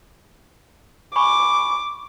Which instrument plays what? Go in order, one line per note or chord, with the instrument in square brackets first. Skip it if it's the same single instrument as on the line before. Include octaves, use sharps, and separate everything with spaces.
[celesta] G#5 B5 C#6 [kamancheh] D6